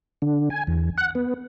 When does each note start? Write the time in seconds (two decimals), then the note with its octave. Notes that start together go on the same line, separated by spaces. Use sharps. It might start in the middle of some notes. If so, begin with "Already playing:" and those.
0.22 D3
0.50 G#5
0.67 E2
0.98 F#5
1.15 B3